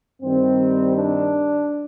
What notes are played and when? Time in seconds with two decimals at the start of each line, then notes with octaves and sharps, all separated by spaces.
0.21 G2 D#3 G3 C4
0.95 D4